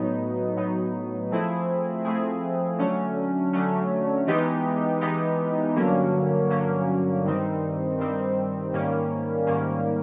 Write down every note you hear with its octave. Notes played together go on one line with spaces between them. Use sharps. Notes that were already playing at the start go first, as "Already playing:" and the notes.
Already playing: A2 F#3 B3 D#4
A2 F#3 B3 D#4
F3 A3 C4 E4 G#4
F3 A3 C4 E4 G#4
D3 F#3 A3 C#4
D3 F#3 A3 C#4
E3 G#3 B3 D#4 G4
E3 G#3 B3 D#4 G4
G2 D3 F#3 A#3 C#4
G2 D3 F#3 A#3 C#4
G2 D#3 G3 C4 D#4
G2 D#3 G3 C4 D#4
G#2 D#3 G3 A#3 C#4
G#2 D#3 G3 A#3 C#4